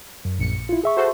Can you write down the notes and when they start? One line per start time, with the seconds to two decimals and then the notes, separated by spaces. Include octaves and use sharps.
0.25 F#2
0.39 A#1 C#7
0.69 E4 F4
0.84 G#4 E5 C#6
0.97 F#4 A4 C5